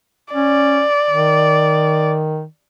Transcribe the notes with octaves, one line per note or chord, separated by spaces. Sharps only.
C#4 D5
D#3